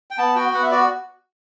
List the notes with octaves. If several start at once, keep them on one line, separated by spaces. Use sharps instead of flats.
G5
B3 A5
F#4 G5
B3 F#5
E5
F#4 D5